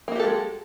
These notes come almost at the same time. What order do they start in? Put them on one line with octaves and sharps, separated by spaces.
A#3 F#4 G4 A4 G#3